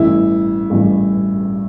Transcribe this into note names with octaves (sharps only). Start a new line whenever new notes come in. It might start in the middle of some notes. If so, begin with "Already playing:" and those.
Already playing: A1 G2 E3 E4
A1 G2 E3